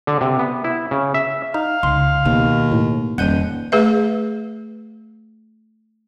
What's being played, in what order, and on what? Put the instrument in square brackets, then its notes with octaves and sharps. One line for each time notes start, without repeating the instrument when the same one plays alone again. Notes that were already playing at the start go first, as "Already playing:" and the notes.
[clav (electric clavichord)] D3
C3
B3
E4
C#3
E5
[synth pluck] D#4 [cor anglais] F5
[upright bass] C#2 [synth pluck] C6
[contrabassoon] D#2 [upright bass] B2
[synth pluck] A2
[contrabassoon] D#1 [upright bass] F2 F3 [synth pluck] F#5 G6 D#7
[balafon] A3 G#4 B4 E5